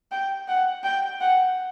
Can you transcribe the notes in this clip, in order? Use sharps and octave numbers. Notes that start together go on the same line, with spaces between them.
G5
F#5
G5
F#5